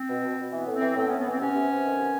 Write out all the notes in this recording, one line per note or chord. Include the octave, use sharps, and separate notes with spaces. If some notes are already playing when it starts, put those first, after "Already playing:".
Already playing: C4
B2
B2
B2
E3 B3
A2
C4
E3
A2 C4
A2 B3 C#4
B3
E3 C4
C3 B3 C#4
C3
C3
D#3
C3